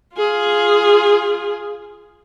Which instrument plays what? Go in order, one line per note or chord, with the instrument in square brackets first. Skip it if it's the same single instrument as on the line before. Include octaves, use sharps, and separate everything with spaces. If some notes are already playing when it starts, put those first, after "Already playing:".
[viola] F4 G#4